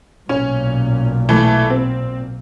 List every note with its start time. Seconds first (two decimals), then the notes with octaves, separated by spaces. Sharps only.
0.29 B1 A#2 C#4
1.29 E3 A3
1.70 C4